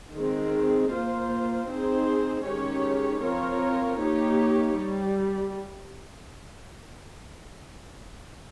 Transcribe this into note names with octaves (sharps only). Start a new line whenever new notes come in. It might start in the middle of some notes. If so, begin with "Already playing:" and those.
D#3 G#3 C4
A#3 F4 C5
C4 D#4 G#4 C5
D#3 G#3 C#4 G4 C#5
F3 C4 F4 A#4 C#5
A#3 D#4 G4 C#5
G3